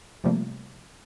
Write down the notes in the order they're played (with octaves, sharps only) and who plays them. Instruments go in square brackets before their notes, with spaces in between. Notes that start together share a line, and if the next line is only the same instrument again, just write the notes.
[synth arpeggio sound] C3 F3 G3 A3 A#3